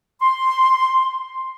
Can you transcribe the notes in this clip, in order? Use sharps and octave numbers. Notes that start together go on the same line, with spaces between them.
C6